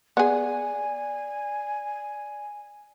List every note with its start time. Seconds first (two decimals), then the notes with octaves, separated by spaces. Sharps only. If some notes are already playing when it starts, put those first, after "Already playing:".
0.17 B3 G#4 D5 G#5